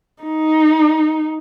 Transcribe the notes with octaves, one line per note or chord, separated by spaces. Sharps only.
D#4